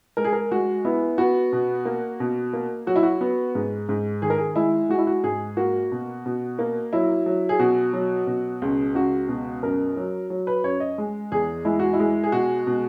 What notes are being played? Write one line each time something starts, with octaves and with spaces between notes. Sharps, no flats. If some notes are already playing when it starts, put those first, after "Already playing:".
G#3 A#4
G#4
A#4
G#3 F#4
B3 E4
B3 F#4
B2
A#3
B2
A#3
F#3 F#4
E4
F#4
B3
G#2
G#2
D#3 G#4
A#4
G#4
G#3 E4
G#3 F#4
E4
F#4
G#2 G#4
A#3 F#4
B2
B2
A#3
F#3 E4
F#3
G#4
B2 F#4
F#3
B2
C#2
C#2 F#4
B2
F#2 A#4
F#3
F#3
B4
F#2 C#5
D#5
G#3
E2 G#4
G#3 E4
F#4
E4
G#3
G#4
B2 F#4
B2